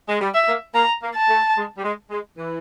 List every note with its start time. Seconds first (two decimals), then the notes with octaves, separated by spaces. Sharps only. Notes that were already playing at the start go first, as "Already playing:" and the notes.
0.09 G#3
0.21 G3
0.34 E5
0.48 A#3
0.75 A#3 A#5
1.02 A#3
1.16 A5
1.29 A3
1.57 G#3
1.77 G3
1.84 G#3
2.10 G#3
2.38 E3